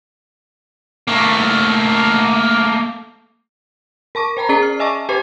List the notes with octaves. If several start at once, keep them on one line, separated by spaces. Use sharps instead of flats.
A3 A#3
A#4 A5 C#6 D6
C5 G5 A#5 B5
C#4 G#4 D5 A#5 C7
F6
D#5 E5 G#5 A5 C#6 D6
G4 B4 C5 G5 B5 D6